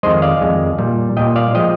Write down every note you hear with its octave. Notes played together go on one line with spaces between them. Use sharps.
F2 D#3 G#3 C5 D#5
D5 F5
F2 D#3 G#3
A#2 G3
A#2 G3 D#5 G5
D5 F5
F3 G#3 D#5 G5